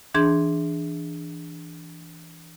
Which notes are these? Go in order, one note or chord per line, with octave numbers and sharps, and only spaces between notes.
E3 D4 G#4 C6 G#6